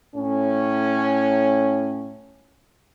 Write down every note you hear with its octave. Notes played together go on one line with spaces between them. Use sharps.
A2 C#4